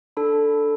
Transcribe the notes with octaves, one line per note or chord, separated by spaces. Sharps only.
D4 A4 B5